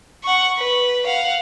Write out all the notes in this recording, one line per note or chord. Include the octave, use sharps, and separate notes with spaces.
F#5 C#6
B4
F5 F#5